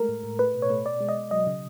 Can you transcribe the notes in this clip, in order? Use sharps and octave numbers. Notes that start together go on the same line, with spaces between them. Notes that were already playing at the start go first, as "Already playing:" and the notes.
Already playing: G#3 A3 A#4
A2
A2
A3 B4
B2
C#5
A3
B2 D5
G#3
D#5
B2
F#3 D#5
C#3